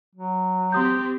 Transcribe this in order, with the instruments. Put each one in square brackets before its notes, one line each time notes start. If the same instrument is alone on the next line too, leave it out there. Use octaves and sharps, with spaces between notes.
[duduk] F#3
[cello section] C4 G4 [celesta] C6 D#6 G6